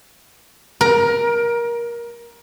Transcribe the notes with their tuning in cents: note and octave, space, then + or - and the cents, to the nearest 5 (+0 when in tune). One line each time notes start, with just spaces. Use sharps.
A#4 +20